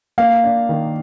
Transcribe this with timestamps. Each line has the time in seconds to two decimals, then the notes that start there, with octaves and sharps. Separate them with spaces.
0.18 A#3 F5
0.44 D4
0.69 D#3